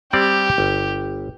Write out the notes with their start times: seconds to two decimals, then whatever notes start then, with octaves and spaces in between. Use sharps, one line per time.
0.13 G3 C4 G4 D5
0.58 G1